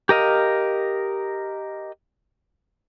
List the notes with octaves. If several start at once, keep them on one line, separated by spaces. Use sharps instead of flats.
G4 A#4 D#5 F5